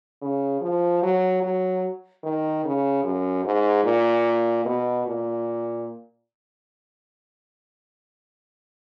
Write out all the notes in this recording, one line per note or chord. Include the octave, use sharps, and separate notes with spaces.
C#3
F3
F#3
F#3
D#3
C#3
F#2
G#2
A#2
B2
A#2